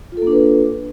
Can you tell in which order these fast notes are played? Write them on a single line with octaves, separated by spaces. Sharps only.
F4 A4 A#3 D4 B4